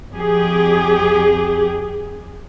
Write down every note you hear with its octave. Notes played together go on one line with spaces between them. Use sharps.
F2 G4 G#4